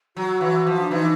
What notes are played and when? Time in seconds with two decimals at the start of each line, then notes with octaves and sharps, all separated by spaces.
0.16 F#3 F#4
0.41 E3
0.66 F3
0.79 D4
0.91 E3 D#4